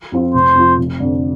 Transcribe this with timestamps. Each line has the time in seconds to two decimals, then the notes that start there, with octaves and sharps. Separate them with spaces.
0.12 F2 F3 C4 F4
0.34 F1 C5
0.55 F2 F3
0.78 F1
1.00 F2 D3